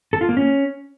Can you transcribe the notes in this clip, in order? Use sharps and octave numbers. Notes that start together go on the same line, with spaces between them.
A4
F4
A#3
C#4